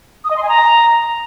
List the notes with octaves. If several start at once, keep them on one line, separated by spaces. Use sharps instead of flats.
D#6
D#5
C6
G#5
A#5